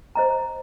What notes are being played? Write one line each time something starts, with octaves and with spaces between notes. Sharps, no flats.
C5 D#5 A#5